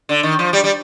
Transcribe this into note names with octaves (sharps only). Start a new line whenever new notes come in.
D3
D#3
F3
G3
G3